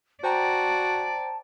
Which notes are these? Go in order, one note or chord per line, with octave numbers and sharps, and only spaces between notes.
F#4 C5 D5 G5 A5 A#5